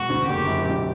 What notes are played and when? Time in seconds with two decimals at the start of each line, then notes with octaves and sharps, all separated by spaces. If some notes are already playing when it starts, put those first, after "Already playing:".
Already playing: E1 F#4
0.09 D2 D3
0.27 F#1 G4
0.46 F#2 C#3
0.65 B1